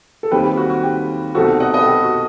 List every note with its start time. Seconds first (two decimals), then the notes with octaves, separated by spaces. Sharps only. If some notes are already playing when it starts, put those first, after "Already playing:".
0.23 A4
0.31 D#2 D#3 G3 C4 G4 B4
0.44 G4
0.57 F#4
0.70 F#4
0.83 G4
1.35 C2 B2 A3 C4 D#4 F#4 A4
1.60 D#5 F#5
1.74 B4 D#5
1.81 A4
1.86 G4
2.03 F#4